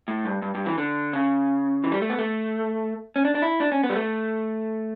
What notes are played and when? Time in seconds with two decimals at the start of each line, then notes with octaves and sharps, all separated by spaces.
0.08 A2
0.25 G2
0.42 G2
0.55 G2
0.66 E3
0.78 D3
1.13 C#3
1.84 E3
1.92 G3
2.02 A3
2.10 B3
2.19 A3
3.16 C#4
3.25 D4
3.35 D4
3.42 E4
3.60 D4
3.72 C#4
3.83 B3
3.90 G3
3.96 A3